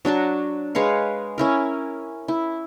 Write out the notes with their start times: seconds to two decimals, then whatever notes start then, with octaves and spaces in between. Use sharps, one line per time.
0.05 F#3 D4 F#4 A5
0.75 G#3 B4 C#5 F5
1.38 C#4 E4 A#4
2.28 E4